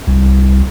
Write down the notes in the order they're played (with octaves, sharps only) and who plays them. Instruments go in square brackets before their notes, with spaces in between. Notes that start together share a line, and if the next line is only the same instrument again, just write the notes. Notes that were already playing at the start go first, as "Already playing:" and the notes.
[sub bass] C2